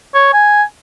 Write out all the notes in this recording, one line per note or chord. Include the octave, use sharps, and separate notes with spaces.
C#5
G#5